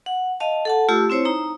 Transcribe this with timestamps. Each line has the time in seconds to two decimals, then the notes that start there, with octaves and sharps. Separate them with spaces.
0.06 F#5
0.40 D#5 F5 A5
0.65 A4 F#5 A5
0.89 A3 F4 G4 E6
1.10 C4 E4 C5 C#5
1.25 D#4 A#5